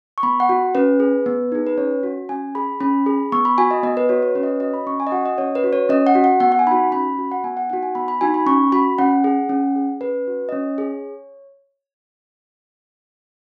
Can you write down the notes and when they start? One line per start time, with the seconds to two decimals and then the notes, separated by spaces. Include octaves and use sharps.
0.18 C#6
0.23 B3 B5
0.40 F#5
0.49 F#4
0.75 C#4 B4
1.00 G#4
1.26 B3
1.52 D#4 G#4
1.67 B4
1.78 C#4 C#5
2.03 F#4
2.29 C#4 G#5
2.55 G#4 B5
2.80 C#4 B5
3.06 G#4
3.32 B3 C#6
3.45 B5
3.58 F#4 G#5
3.71 D#5
3.83 B3 D#5
3.97 B4
4.09 F#4 C#5
4.23 C#5
4.35 C#4 B4
4.43 D#5
4.48 C#5
4.60 F#4 D#5
4.74 B5
4.87 C#4 C#6
5.00 G#5
5.07 D#5
5.12 F#4 F#5
5.26 D#5
5.38 C#4 C#5
5.55 B4
5.64 F#4
5.73 C#5
5.89 C#4 D#5
6.07 F#5
6.15 F#4
6.24 F#5
6.40 B3 F#5
6.52 F#5
6.59 G#5
6.67 D#4 F#4 B5
6.92 C#4 B5
7.18 F#4
7.32 F#5
7.44 B3 G#5
7.57 F#5
7.70 D#4 F#4 F#5
7.83 G#5
7.95 B3 B5
8.08 B5
8.21 D#4 F#4 G#5
8.34 B5
8.46 C#4 C#6
8.72 F#4 B5
8.98 C#4 F#5
9.24 G#4
9.49 C#4
9.76 G#4
10.01 C#4 B4
10.27 F#4
10.49 D#5
10.52 C#4 C#5
10.78 G#4